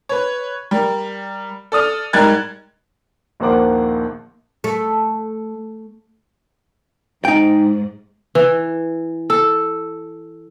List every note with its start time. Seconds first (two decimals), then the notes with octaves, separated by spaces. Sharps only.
0.09 B4 C#5
0.71 G3 A#4
1.72 A4 D5 D#6 F6
2.13 G#2 G3 A#4 F#6 G#6 A6
3.40 A#1 D#2 A#3 C5 F#5 D6
4.64 A3
7.25 G#2 D#4 G5
8.35 E3
9.30 A4